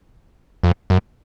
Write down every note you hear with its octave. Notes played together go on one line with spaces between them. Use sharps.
F2
F#2